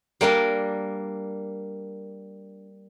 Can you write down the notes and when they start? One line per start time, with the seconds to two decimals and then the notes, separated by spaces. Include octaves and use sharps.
0.21 G3 A#3 D4 A#4